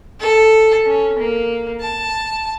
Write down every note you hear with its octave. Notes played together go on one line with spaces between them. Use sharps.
A4
C#4
A#3
A5